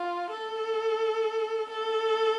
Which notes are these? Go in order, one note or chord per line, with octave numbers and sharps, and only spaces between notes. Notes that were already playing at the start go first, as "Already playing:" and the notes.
Already playing: F4
A4
A4